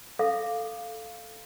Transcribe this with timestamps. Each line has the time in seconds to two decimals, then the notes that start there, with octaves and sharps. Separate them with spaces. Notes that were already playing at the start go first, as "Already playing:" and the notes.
0.19 A4 E5 F5 D6